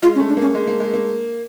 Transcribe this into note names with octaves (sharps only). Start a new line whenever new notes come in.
G#3 F4
C#4
A3
D4
A#3 C#4
G#3
A#3
G#3
A#3